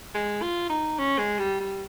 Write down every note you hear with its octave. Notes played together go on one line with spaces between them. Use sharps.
G#3
F4
D#4
C#4
G#3
G3
G3